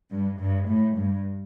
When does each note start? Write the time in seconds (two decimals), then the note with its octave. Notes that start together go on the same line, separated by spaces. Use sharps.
0.11 G2
0.40 G2
0.68 A2
0.96 G2